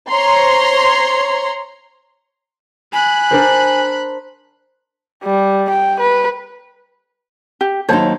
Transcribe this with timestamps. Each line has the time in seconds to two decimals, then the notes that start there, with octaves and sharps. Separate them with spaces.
0.10 C5 C#5 A#5 C6
2.93 G#5 B5 F#6
3.31 D4 A#4 C5
5.24 G3
5.70 G5
6.00 B4
7.61 G4
7.89 D#2 F#3 D#4 C5 C#5 A5